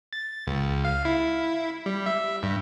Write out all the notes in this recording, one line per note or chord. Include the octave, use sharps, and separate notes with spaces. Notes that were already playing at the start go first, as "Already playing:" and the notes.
A6
C#2
F5
E4
G3
E5
G2